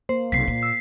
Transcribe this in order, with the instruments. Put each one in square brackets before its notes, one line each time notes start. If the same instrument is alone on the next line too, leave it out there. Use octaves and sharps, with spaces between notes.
[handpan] A#3 [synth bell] C5
[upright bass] B1 C3 [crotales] B6 C7
[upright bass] A#2
[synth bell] E6